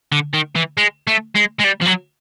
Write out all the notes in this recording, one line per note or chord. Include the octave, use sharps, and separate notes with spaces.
D3
D#3
E3
G#3
A3
G#3
G#3
G3
F3
F#3